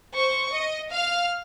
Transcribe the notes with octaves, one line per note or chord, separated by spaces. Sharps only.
C5 C#6
D#5
F5 F6